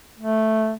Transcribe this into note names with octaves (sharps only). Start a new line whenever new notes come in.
A3